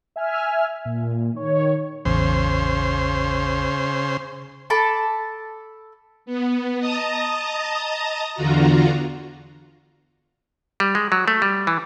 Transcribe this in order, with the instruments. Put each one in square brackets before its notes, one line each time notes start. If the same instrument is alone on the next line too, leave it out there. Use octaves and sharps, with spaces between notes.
[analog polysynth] E5 G#5 F6
A#2
D#3 C#5
[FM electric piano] A1 E2 [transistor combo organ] C#3 C5
[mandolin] A4 A5 B5 D6
[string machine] B3
D#5 A5 A#5 D#6
E2 D3 F4 F#4 A#5
[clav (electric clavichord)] G3
G#3
F#3
A3
G3
E3